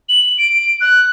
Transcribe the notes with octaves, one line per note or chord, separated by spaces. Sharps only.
F#7
D7
F#6